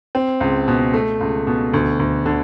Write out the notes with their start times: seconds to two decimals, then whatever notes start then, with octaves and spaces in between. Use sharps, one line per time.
0.15 C4
0.41 C#2
0.68 B2
0.93 A3
1.21 C#2
1.47 B2
1.73 D2
2.00 D2
2.26 D3